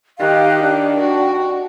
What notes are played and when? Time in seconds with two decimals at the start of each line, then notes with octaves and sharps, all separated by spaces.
0.20 D#3 G4 F5 F#6
0.63 D4 G5
1.00 F#4